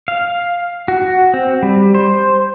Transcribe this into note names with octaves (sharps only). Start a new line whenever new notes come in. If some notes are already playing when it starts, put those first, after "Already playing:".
F5
F#4
C4
G3
C5